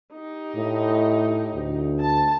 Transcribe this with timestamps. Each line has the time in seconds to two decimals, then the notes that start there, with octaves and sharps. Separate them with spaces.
0.13 D#4 G4
0.56 A2
1.55 D2
2.01 A5